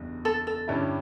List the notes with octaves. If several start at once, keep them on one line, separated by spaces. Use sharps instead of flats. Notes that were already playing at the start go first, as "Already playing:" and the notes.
Already playing: F#1 E2 B2 G3 D4
A4
A4
G2 D3 G3 C#4 E4